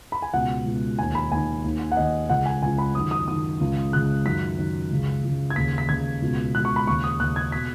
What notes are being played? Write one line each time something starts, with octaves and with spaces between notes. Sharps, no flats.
B5
G#5
C#2 B2 F#5
C#2 B2
D#2 D#3 G#5
B5
D#2 D#3 G#5
D#2 D#3
F#5
D#2 D#3 D#5
C#2 C#3 F#5
G#5
C#2 C#3 G#5
B5
F#2 D#3 D#6
D#6
F#2 D#3 D#6
C#2 C#3
C#2 C#3 F#6
F#2 D#3 B6
F#2 D#3
C#2 C#3
C#2 C#3
G#6
D#2 C#3 B6
B6
D#2 C#3 G#6
C#2 B2
C#2 B2 F#6
C#6
B5
D#2 C#3 C#6
D#6
D#2 C#3 F#6
G#6
B2 B6